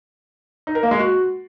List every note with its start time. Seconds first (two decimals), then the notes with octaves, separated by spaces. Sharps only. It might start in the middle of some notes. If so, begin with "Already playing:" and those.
0.67 D#4
0.75 A#4
0.83 A#3
0.91 G#3
0.99 F#4